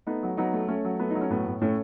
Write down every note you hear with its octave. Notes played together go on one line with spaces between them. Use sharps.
A3 B3 D#4
F#3
F#3 B3 D#4
A3
A3 C#4
F#3
A3 B3
F#3 D#4
C#4
A2 B3
A2
A2 A3 C#4